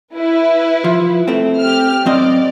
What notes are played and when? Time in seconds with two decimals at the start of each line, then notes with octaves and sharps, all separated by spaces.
0.15 E4 B4
0.84 F3
1.28 A3 C4
1.60 G4 F6
2.06 F#2 C4 D5 D#5